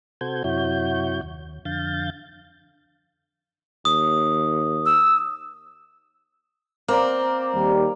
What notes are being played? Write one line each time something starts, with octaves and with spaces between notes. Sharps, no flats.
C3 F#4 A4 C5 G6 G#6
F#2 C3 E4 F#4 C#5 G6
D#2
F2 D3 F5 G6 A6
D#2 D#6
E6
A#3 C4 D5
D#2 G3